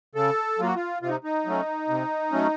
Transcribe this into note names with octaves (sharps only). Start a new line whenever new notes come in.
C#3 A4
F#3 A#3 F4
F#4
F4
C3 F4
D#4
D#4
F#3 A3 C#4
C3
F#3 A3 C#4